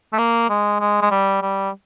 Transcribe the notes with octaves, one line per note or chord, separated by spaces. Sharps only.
A3
A#3
G#3
G#3
G#3
G3
G3